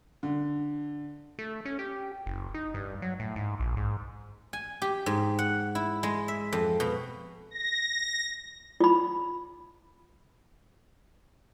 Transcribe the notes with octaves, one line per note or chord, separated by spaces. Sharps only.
D3
A3
C#4
G4
F#1
D#4
G2
F#3
A2
G#2
A#1
G#2
G#5
G4
G#2
F#5
E4
G#3
E5
F2
B2
A#6
F4 B5